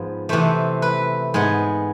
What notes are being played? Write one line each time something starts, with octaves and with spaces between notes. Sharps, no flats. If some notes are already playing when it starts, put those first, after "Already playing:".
Already playing: G#2 F3 B3
C3 E3 A3 C5
B4
G#2 G#3 B3